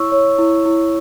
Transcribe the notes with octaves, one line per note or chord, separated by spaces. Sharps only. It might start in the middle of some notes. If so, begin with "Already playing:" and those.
Already playing: E4 C#5 C#6 E6
C#5
E4
E4